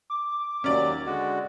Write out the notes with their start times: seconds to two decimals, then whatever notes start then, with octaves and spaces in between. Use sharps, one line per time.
0.10 D6
0.64 D#2 F#3 C#4 D5
1.06 D3 G#3 F#4